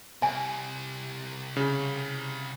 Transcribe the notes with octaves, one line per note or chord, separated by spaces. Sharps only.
C2 G#5
C#3